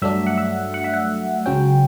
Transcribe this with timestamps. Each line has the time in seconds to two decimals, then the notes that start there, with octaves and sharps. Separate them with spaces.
0.02 G2 F#3 A3 D4 E5
0.27 F#5
0.38 E5
0.74 F#5
0.84 E5
0.94 F#5
1.46 C#2 C#3 F#3 C#4 G5